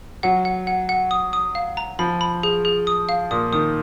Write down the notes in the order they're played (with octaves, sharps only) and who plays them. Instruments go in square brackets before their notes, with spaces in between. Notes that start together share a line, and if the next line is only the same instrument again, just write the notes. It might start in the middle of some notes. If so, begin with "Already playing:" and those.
[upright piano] F#3 [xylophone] F#5
[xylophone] F#5
F#5
F#5
D#6
D#6
F5
A#5
[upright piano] F3 [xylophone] B5
[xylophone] B5
G#4
G#4
D#6
F5
[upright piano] A#2 [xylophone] D#6
[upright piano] D#3 [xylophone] D#6